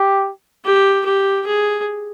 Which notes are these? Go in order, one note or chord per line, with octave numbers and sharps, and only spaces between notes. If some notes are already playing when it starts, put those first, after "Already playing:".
Already playing: G4
G4
G4
G#4